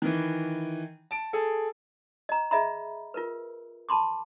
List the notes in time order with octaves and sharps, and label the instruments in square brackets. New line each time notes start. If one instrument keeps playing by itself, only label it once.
[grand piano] D#3 E3
A5 D7
G#4 A4
[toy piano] D#5 A#5
G#4 D#5 E5 A#5 B5
F4 A#4 B4
A5 B5 C6 D6